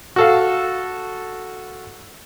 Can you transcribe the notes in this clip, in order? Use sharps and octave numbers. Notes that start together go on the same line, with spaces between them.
F#4 A4 F5